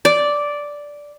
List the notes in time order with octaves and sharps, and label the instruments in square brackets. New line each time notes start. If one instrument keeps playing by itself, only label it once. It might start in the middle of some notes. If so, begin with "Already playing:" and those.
[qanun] D5